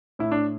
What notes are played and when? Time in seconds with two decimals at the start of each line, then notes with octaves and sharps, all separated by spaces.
0.19 A2 E4
0.31 D4